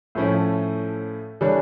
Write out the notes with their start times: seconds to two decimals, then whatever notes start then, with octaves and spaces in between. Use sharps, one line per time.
0.15 A2 F3 A3 C#4 E4
1.41 E3 G3 D4 A4 C#5